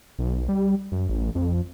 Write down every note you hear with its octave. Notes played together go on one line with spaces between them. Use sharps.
B1
G3
F#2
A1
F2